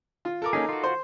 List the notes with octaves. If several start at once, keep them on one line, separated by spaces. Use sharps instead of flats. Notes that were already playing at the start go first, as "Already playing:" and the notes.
F4
A4 A#4 D6
A#3 C#4 D#4 G#4
F4 F#4
C5